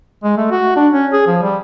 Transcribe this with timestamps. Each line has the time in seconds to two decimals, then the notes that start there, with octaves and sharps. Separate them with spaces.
0.23 G#3
0.37 A3
0.51 F#4
0.76 D4
0.93 C#4
1.13 G#4
1.27 F3
1.42 G3